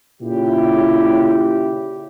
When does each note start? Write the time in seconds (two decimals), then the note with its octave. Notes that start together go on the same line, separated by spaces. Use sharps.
0.22 A#2 C#3 E4 G4